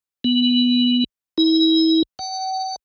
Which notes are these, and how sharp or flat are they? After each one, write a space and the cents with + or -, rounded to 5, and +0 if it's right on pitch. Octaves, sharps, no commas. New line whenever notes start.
B3 -5
E4 -40
F#5 +45